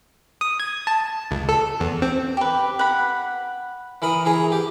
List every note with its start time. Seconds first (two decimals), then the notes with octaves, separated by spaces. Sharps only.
0.41 D#6
0.60 G#6
0.87 A5
1.31 C#2
1.49 A4
1.80 E2
2.02 C4
2.37 G4 B4
2.79 F#5 B5
4.02 E3 A#4 B5 D#6
4.25 E3 G#4 A#5
4.52 G4